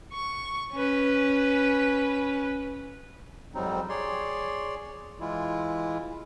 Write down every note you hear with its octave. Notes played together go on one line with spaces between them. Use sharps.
C#6
C#4 B4
F2 G#2 F#3 G3 C4 D#4
G#4 C#5 D5 C6
E3 G#3 E4 F4